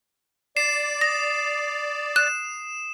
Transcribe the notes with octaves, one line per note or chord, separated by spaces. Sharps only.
D5 C7 E7
D#6 A#6
F#6 E7